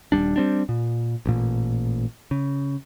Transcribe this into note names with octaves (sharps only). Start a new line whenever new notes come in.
D#1 E2 G3 D4
G3 C4 D4
A#2
A1 A#2
C#3